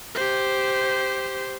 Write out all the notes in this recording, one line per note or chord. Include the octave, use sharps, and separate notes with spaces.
G4 C5